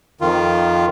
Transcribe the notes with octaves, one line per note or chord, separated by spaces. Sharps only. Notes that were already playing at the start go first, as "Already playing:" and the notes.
F2 D#3 F4